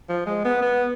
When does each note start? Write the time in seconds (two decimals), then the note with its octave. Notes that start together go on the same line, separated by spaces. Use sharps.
0.09 F3
0.26 G#3
0.45 B3
0.62 B3